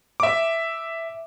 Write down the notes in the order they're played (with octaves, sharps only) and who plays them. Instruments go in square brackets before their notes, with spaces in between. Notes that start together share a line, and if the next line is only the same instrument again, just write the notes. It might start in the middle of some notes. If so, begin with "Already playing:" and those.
[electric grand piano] E5 D6